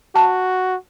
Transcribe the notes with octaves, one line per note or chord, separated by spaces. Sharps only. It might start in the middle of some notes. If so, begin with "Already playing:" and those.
F#4 A5